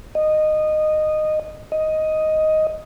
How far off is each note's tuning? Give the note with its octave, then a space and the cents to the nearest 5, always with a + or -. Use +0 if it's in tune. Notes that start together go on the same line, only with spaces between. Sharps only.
D#5 -15
D#5 +5